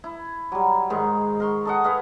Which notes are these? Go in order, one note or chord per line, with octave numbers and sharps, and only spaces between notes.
E4
F#3 G3
G#2 D#3 G#3
A#4 C6 C#6
A4 D#5 F#5
G#4 B4 D#5 F5